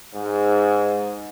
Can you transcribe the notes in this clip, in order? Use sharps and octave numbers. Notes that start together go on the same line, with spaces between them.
G#2